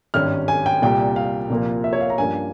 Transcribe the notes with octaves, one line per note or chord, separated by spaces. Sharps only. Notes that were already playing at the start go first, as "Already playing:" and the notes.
G#1 G2 G3 C#4 F6
G#5
G5
C2 A#2 G3 G5
F5
C2 A#2 F3 A#3
E5
C#5
F5
A#5
G2 F3 A#3 C#4 G#5